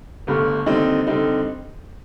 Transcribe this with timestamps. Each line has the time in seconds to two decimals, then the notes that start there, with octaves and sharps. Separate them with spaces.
0.27 G1 G2 D3 A3
0.66 D#2 D3 G3 C4 D#4
1.07 D3 G3 C4 D#4